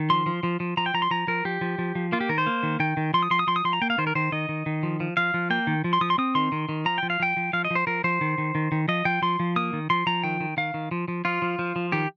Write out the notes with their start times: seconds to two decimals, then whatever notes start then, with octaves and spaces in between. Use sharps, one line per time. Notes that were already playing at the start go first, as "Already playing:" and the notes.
Already playing: D#3
0.10 F3 C6
0.26 F3
0.43 F3
0.60 F3
0.77 F3 A#5
0.86 G5
0.94 F3 A#5
1.02 C6
1.11 F3 A#5
1.27 F3 A#4
1.45 F3 G4
1.61 F3
1.78 F3
1.95 F3
2.12 A#3 F4
2.21 G4
2.29 D#3 A#4
2.38 C5
2.46 A#3
2.63 D#3
2.80 D#3 G5
2.97 D#3
3.14 F3 C6
3.23 D#6
3.31 F3 C6
3.39 D#6
3.47 F3 C6
3.56 D#6
3.65 F3 C6
3.73 A#5
3.81 A#3 G5
3.90 F5
3.98 D#3 C5
4.07 A#4
4.15 D#3 C5
4.32 D#3 D#5
4.49 D#3
4.66 D#3
4.83 F3
5.00 F3
5.17 F3 F5
5.34 F3
5.50 A#3 G5
5.67 D#3
5.84 F3
5.93 C6
6.01 F3 D#6
6.10 C6
6.18 C4 D#6
6.35 D#3 C6
6.52 D#3
6.69 D#3
6.85 F3 A#5
6.98 F3 G5
7.10 F5
7.20 F3 G5
7.37 F3
7.53 F3 F5
7.65 D#5
7.71 F3 C5
7.87 F3 A#4
8.04 F3 C5
8.21 D#3
8.38 D#3
8.55 D#3
8.72 D#3
8.88 F3 D#5
9.05 F3 G5
9.22 F3 C6
9.40 F3
9.56 A#3 D#6
9.73 D#3
9.90 F3 C6
10.07 F3 A#5
10.23 D#3 G5
10.40 D#3
10.57 D#3 F5
10.74 D#3
10.91 F3
11.08 F3
11.25 F3 F4
11.42 F3
11.59 F3
11.76 F3
11.92 D#3 G4